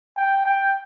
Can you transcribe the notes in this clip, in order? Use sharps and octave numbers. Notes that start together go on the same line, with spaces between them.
G5
G5